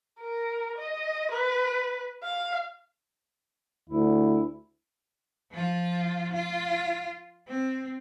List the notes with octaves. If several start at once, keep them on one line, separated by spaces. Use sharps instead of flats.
A#4
D#5
B4
F5
D2 E4
F3 F4
F4
C4